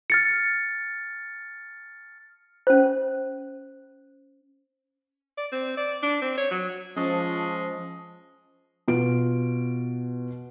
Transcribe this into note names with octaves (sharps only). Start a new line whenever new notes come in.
F6 A6 C#7
C#4 C5
D5
C4
D5
D4
C4
C#5
F#3
F3 G#3 C#4 A5 C#6
B2 F4 D7